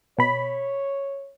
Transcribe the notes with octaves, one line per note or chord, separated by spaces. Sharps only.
B2 C#5 B5